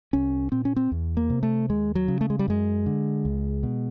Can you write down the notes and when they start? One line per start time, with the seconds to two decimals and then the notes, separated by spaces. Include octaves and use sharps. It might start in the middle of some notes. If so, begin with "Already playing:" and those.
0.13 C2 C#4
0.52 A#2 C4
0.65 C#4
0.76 C4
0.92 E2
1.17 A#3
1.30 C3
1.43 A3
1.69 D#2 G#3
1.95 F#3
2.08 C#3
2.21 A3
2.30 G#3
2.39 G3
2.48 F#2 G#3
2.86 D3
3.25 C#2
3.63 B2